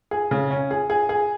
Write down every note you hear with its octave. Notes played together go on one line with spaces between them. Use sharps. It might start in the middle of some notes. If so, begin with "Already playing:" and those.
G#4
C#3
C#4
G#4
G#4
G#4